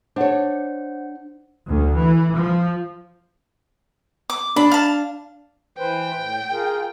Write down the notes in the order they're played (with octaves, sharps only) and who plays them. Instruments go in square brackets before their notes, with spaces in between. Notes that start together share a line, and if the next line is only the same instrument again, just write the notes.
[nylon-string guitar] D4 C#5 [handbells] C5 F#5
[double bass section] D2
E3
F3
[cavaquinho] D6
[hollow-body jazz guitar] D4 [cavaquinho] B5
[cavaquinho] F5 A5
[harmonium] E3 B4 C5 [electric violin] G5
[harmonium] A2
F4 G#4 A#4